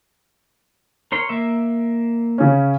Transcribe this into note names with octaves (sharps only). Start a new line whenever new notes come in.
A#4 C#5 C6
A#3 E5
C#3 C#4